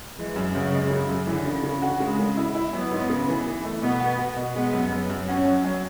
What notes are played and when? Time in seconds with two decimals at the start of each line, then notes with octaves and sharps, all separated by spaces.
0.18 E3 G#3
0.36 F#2
0.55 F#2 C#3
0.72 G#3
0.91 C#3
1.09 F#2
1.27 D3 E3
1.45 C#3
1.63 C#3
1.82 F#4
2.00 C#3 G#3
2.19 C#3
2.37 E4
2.55 E4
2.73 F#3 B3
2.92 G#2
3.10 C#3
3.28 E3
3.46 E3
3.65 A3
3.82 B2 B3
4.00 F#4
4.18 F#4
4.36 B2
4.55 G#3 B3
4.73 F#2
4.91 F#2
5.09 F#2
5.28 C#4 F#4
5.46 F#3
5.65 F#3